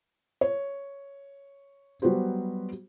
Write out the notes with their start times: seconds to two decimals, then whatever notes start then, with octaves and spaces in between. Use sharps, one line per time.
0.41 C#5
2.02 F#3 G3 B3 F#4 G4 C5